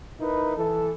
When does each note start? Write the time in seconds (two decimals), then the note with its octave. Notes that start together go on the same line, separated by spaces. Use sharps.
0.20 D#4 E4 A#4 B4
0.56 E3 A4